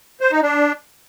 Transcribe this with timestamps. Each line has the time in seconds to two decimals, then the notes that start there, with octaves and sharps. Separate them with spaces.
0.21 C5
0.31 D#4
0.42 D4